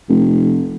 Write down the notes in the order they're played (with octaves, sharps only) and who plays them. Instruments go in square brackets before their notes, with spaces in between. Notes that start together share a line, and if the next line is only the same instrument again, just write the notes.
[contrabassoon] F1